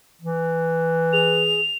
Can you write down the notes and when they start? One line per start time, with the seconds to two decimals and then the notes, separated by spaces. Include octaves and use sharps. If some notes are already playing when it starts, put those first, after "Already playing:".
0.22 E3
1.13 G#4 F7